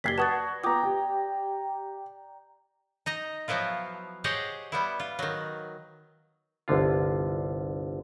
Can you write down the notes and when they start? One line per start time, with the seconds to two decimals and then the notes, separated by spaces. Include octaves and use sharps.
0.04 F#1 G4 D5 G#6 B6 C7 G7
0.18 F#4 B4 F#5 A5 D#6 A6
0.64 B3 F4 G5 A#5 D6 D#6
0.83 G4
3.06 D#4 D#5 A#5
3.48 F3 F#3 B3 E4 F4
4.24 G4 G#4 C5 C#5 D#5 F#5
4.72 G3 B3 E4
5.00 F4
5.19 D#3 F#3
6.68 G1 C2 D3 F4